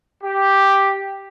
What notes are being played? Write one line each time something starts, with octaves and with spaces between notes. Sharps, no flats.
G4